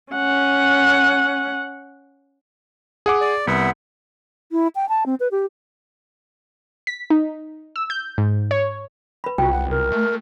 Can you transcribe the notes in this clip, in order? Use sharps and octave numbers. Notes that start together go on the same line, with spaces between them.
C#4 F#5
G#4 F#5 D6
D5
C2 B3 E5 F#5
E4
G5
A5
C4
B4
G4
B6
D#4
E6
G6
G#2
C#5
B4 B5
C2 F4 F#4 G5
F#5
C2 A#4
A3